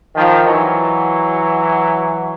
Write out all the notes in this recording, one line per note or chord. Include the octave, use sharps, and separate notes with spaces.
D#3 F3
E3 F#3